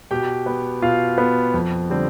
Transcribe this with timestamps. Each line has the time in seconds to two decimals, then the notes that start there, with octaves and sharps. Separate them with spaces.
0.11 B2 G4 G5
0.46 B3
0.82 B2 F4 F5
1.18 B3
1.54 F2
1.90 D3 G3 C4